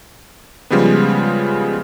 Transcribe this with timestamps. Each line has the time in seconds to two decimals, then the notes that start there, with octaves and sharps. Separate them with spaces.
0.70 C#3 F3 G3 G#3 B3